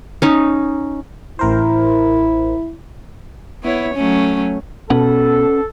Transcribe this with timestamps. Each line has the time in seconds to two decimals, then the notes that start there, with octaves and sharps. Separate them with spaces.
0.22 C#4 D#4
1.39 A1 E4 A#4 C5
3.63 B3 E4 C#5
3.94 F#3 A3 C#4
4.90 B2 C#4 A4 B4 F#5